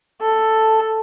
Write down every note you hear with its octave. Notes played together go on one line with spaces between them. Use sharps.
A4